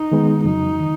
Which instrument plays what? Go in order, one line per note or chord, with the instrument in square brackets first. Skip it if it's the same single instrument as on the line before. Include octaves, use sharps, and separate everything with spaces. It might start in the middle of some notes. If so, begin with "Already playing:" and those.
Already playing: [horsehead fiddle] D#4
[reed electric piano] D#3 G#3 B3
[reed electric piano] F2 C#3 F#3 [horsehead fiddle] D#4
[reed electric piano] D#3